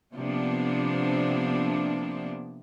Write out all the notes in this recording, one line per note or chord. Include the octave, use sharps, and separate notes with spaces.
C3 F3 A#3 B3 D4